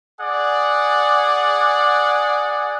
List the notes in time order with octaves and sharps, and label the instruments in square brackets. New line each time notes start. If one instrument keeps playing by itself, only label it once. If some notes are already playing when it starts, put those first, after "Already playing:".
[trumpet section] G#4 D5 F#5